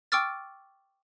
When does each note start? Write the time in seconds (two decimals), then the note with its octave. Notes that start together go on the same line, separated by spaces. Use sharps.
0.12 G5 C#6 D6 E6 F6 A6